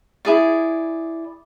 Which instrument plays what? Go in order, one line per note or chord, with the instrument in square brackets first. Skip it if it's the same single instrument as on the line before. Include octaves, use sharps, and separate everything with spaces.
[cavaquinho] E4 G#4 D5